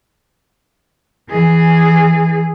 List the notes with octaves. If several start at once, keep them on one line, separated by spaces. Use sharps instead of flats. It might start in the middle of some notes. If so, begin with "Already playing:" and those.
E3 G#4